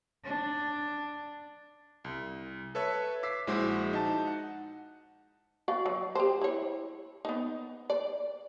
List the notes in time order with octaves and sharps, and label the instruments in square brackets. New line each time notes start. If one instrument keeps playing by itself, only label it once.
[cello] D4
[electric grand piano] C2
A4 B4 C#5 E5
D6 E6 B6 C7
A#1 G#3 E4 F#4 C5 D6
D#4 A5
F#5
[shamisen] F#4 D5 F5
F#3
G4 C5
E4 C#5
B3 D#4
D5